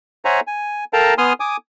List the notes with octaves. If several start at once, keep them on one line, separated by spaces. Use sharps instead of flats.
C5 C#5 E5 F#5 G#5 A#5
G#5
A4 A#4 F5 G5 A5 A#5
B3 G#5 C6 D#6 F6
G#5 D6 D#6